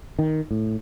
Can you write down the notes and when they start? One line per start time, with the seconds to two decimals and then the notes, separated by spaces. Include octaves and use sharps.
0.19 D#3
0.51 A2